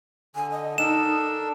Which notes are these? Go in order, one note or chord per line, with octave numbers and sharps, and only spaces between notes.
D3 G#5
D#5
D4 D#4 A4 A#4 E7